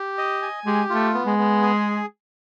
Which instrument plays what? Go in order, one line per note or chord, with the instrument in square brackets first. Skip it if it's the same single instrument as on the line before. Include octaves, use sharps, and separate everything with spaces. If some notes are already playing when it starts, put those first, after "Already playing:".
Already playing: [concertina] G4
D#5
G#5
[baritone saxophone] G#3 [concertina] G4
[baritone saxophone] A3 [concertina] F4
[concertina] B3
[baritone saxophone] G#3
[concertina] B3
G#4